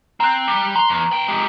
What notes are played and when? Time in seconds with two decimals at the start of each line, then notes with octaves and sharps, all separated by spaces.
0.20 C4 A#5 F#6
0.48 G3
0.76 A#5 C6
0.89 E2
1.11 B3 G5
1.28 G#3 G4